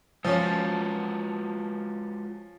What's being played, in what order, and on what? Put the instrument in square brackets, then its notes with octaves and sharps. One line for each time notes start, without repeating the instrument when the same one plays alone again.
[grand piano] F3 C#4 [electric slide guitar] G#3 F4 F#4